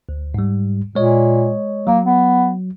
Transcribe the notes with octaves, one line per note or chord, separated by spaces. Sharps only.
D2
G#2 G3
A#2 G#3 C#5 D#5
F#3 A#3
B3